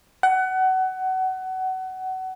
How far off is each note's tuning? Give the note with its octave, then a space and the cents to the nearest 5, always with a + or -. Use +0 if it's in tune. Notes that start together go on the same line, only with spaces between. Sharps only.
F#5 +25